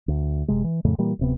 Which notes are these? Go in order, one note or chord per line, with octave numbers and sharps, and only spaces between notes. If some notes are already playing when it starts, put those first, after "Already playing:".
D2
F#1 C3 G#3
E3
F2 A2 C#3 A3
A#2 E3 G3 A#3
D1 C3 B3